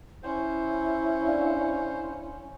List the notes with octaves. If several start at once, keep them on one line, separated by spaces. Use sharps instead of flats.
C#4 E4 C5
D4 D5 F5